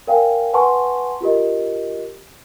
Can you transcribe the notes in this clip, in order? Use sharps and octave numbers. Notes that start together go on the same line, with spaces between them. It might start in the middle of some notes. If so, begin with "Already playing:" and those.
A#4 D5 F5 G5 G#5
B4 F#5 G#5 A5 C6 C#6
F4 G4 A#4 D#5